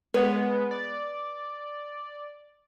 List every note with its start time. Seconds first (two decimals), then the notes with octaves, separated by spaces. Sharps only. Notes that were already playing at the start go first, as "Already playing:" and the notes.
0.14 G#3 B3 B4 C#5
0.71 D5